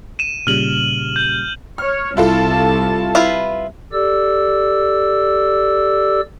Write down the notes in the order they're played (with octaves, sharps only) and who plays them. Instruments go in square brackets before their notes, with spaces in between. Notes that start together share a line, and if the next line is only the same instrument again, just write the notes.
[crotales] D#7 E7
[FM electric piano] A#2 C#3 G3 [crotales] F6 F#7
[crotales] G6
[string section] C#5 [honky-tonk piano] F6
[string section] C2 A5 [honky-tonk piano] E4 F4 A4
[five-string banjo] E4 F4 B4
[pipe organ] G4 A4 D5 E6